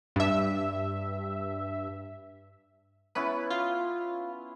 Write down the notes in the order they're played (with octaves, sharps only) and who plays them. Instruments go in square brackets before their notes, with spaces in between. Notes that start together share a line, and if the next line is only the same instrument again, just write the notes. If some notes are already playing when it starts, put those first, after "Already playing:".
[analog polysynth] G2 E5
[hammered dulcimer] B3 C#4 E4 [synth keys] B4
[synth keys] F4